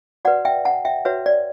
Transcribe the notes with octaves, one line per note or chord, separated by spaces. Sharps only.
F#4 B4 D5 F#5
E5 G5
F#5 A5
E5 G5
F#4 B4 C#5 E5
D5